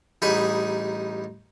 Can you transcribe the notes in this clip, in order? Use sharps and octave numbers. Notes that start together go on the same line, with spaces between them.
A1 G3 D#4 G#4 F#5 B5